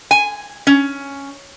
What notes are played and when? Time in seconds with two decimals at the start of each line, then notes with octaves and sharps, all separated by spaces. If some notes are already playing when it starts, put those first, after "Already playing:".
0.11 G#5
0.67 C#4